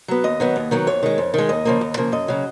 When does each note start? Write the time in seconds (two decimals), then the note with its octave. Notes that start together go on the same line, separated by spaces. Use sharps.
0.08 F#3 B3
0.24 D#2 D#5
0.40 D#3 F#3 B3
0.56 D#2
0.71 D#3 F#3 B3
0.87 F2 C#5
1.03 D#3 G#3
1.18 F2
1.34 D#3 G#3
1.49 D#2 D#5
1.65 C#3 F3 A#3
1.81 D#2
1.97 C#3 F3 A#3
2.12 F#2 D#5
2.28 C#3 F#3